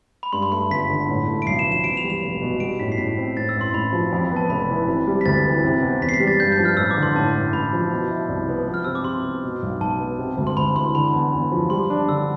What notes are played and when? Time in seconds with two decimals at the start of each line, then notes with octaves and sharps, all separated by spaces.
0.23 B5
0.33 G2 C6
0.42 B5
0.52 A3 C6
0.71 G1 B6
0.90 D3
1.08 A2
1.27 A3
1.42 D7
1.46 B1 C7
1.59 E7
1.66 F3
1.72 E7
1.84 E2 D7
1.97 F7
2.04 G3
2.10 F7
2.23 F1
2.42 B2
2.60 G3 D7
2.80 A2 B6
2.92 C7
2.98 A2 B6
3.17 C4
3.37 A2 A6
3.49 E6
3.56 A1
3.61 C6
3.74 A1 B5
3.93 F3
4.13 F2
4.32 B3 A5
4.50 F1 B5
4.70 E3
4.87 C3
5.07 G3
5.21 B6
5.26 D2 A6
5.44 E3
5.64 C3
5.82 E2
6.02 E2 B6
6.09 C7
6.14 B6
6.20 G3
6.27 A6
6.40 G2 G6
6.52 G6
6.58 F3
6.65 F6
6.77 A1 E6
6.91 D6
6.97 D3
7.03 C6
7.16 A2 A5
7.35 A1
7.53 A1 B5
7.73 F3
7.91 B2
8.10 E4
8.29 C2
8.48 B3
8.67 F3
8.74 F6
8.84 C3 E6
8.95 D6
9.04 C3 C6
9.23 B3
9.43 B2
9.63 B1
9.80 B1 A5
9.99 B3
10.18 C3
10.37 D2
10.47 C6
10.57 D2 B5
10.75 E3 C6
10.95 D3 B5
11.13 E2
11.33 E2
11.52 F3
11.70 G3 C6
11.90 D4
12.09 D3 E6